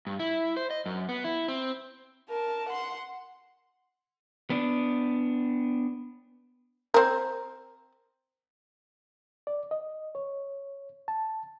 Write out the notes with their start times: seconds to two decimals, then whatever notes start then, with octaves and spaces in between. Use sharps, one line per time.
0.07 G2
0.19 E4
0.57 C5
0.70 D#5
0.86 F#2
1.09 B3
1.24 E4
1.48 C4
2.30 A#4 A5
2.69 F#5 C6
4.50 B3 D4
6.94 C4 A#4
9.47 D5
9.71 D#5
10.15 C#5
11.08 A5